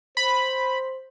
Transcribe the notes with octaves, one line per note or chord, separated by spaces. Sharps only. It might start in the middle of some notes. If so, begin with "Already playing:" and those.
C5 B5